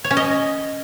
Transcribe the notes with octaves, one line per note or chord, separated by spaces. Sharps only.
C#5
C#4
D#5